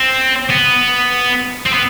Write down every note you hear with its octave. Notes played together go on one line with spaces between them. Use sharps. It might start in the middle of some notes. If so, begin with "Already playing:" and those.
Already playing: C4
B3
C4
B3